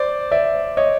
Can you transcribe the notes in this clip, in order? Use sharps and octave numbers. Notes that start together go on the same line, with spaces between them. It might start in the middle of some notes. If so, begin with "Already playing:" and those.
Already playing: C5 D5
D5 E5
C#5 D#5